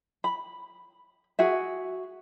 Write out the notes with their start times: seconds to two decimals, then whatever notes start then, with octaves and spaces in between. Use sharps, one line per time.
0.24 B5
1.39 F#4 G#4 E5